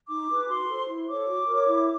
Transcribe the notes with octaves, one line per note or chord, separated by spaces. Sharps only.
D#4 D6
G#4 B4
F#4 C6
A4 C5
E4
A4 C#5 D6
F#4
A#4 C#5
E4